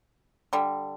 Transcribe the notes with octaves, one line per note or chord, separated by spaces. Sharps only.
D3 G3